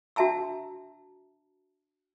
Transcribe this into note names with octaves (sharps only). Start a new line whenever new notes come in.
D4 F#4 E5 A5 A#5 E6